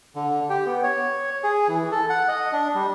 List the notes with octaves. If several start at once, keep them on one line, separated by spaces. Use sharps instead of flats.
D3
G4
B3
C#5
G#4
E3
A4
F#5
D#5
D4
G3